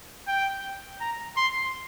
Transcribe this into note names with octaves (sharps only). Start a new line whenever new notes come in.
G5
A#5
C6